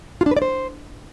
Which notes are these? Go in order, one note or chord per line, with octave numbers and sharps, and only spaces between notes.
F4
D4
B4
D5
C5